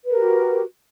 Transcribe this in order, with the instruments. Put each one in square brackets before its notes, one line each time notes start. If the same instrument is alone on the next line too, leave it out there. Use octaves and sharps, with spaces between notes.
[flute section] B4
A#4
G4
F#4